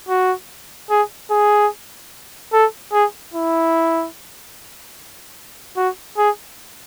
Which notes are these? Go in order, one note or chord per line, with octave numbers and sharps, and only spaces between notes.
F#4
G#4
G#4
A4
G#4
E4
F#4
G#4